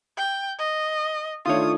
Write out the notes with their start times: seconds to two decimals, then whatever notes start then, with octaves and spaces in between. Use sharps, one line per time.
0.17 G5
0.59 D#5
1.46 D#3 A3 D4 F4 C#5 D#6